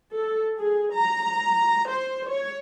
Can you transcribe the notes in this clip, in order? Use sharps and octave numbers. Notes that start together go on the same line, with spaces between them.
A4
G#4
A#5
C5
C#5